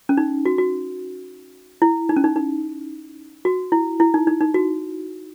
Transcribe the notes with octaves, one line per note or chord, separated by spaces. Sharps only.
C#4
D#4
F#4
F#4
E4
D#4
C#4
D#4
D#4
F#4
E4
E4
D#4
D#4
D#4
F#4